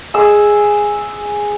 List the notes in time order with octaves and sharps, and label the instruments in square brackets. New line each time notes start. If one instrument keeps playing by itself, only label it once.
[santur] G#4 E6